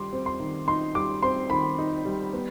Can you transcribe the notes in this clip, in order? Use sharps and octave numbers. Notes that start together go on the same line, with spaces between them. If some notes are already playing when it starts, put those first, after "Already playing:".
Already playing: D#3 G3 C6 D6
C4
C6
D#3
D#4 C6
G3 D6
C4 C6
D#3 B5
D#4
G3
B3